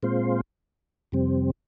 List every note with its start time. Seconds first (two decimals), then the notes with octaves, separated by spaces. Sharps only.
0.03 A#2 G#3 C4 F4 C5
1.12 F2 C3 G3 C4